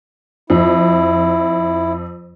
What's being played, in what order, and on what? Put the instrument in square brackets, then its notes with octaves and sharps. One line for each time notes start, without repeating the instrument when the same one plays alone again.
[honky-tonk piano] F2 [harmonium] E4